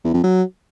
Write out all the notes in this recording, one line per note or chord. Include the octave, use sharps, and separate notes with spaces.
E2
F2
F#3